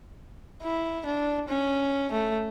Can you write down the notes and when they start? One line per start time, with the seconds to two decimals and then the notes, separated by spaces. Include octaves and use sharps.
0.63 E4
1.06 D4
1.48 C#4
2.12 A3